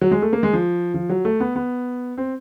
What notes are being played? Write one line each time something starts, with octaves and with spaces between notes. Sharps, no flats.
F#3
G#3
A3
A#3
G#3
F3
F3
F#3
A3
B3
B3
C4